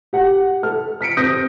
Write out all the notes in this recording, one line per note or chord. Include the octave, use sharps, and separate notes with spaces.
G4 F#5
A4 F6
F6 B6 C#7 D7
C3 C4 D#6 G6 A#6